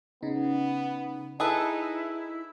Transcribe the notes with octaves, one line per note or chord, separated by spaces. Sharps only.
C#3 B3 D#4
D#4 E4 G#4 A4 B4 E5 E6